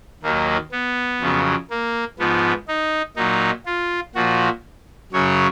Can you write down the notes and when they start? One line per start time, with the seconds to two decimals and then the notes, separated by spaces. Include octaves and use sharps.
0.23 D#2 D#3 F#3 A#3
0.72 B3
1.21 F2 C#3 F#3
1.70 A#3
2.19 G#2 F3 B3
2.68 D#4
3.16 A#2 F#3 D#4
3.66 F4
4.15 A#2 F3 F#4
5.12 F#2 C#3 F#3 C#5